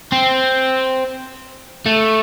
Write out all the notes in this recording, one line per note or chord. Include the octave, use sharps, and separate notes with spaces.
C4
A3